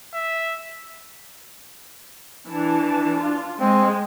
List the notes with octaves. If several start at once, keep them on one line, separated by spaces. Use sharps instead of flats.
E5
E3 D4 A5
F4
G#3 C4